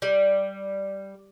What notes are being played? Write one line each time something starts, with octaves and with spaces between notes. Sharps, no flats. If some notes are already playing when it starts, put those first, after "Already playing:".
G3